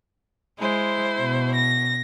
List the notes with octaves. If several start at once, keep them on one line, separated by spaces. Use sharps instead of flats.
G#3 E4 C5
B2
A#6